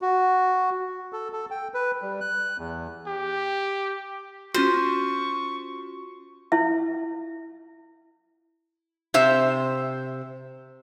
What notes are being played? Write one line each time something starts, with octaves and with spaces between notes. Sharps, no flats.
F#4
A4
A4
G5
B4
G3
F#6
E2
G4
C#4 F4 F#4 C5 C#6
E4 E5
C3 C5 E5